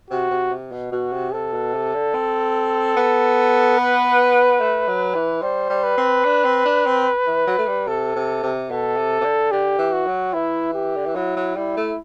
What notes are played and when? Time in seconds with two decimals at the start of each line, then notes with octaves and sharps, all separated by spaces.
0.10 C3 F#4
0.31 C3
0.50 C3
0.72 B2
0.92 B2 F#4
1.13 C3
1.33 C3 A4
1.53 B2
1.74 C3
1.94 D3
2.14 C4
2.96 B3
3.79 B4
4.60 A3
4.88 F#3
5.15 E3
5.42 G3 C5
5.70 G3
5.83 B4
5.97 C4
6.25 D4
6.44 C4
6.65 D4
6.86 C4
7.26 E3
7.47 F#3
7.58 A3
7.67 G3
7.87 C3 A4
8.16 C3
8.43 C3
8.70 B2 A4
8.97 C3
9.21 C3
9.24 D3
9.52 D3 G4
9.78 E3
9.93 F#4
10.07 F#3
10.33 E3 E4
10.74 G4
10.97 D3
11.06 E3
11.15 F#3 E4
11.36 F#3
11.56 G3 E4
11.77 A3